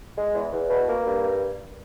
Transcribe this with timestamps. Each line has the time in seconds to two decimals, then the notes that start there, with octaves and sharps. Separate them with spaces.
0.17 G#3
0.34 E2
0.53 E2
0.70 B2
0.88 A#3
1.06 G2